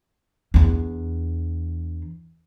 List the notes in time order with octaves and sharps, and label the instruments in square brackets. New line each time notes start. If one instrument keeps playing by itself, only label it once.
[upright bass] E2 D4